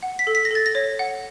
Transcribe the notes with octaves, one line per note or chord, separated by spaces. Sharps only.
F#5
B6
A4
B6
A#6
A4 A6
A#6
C#5
F#5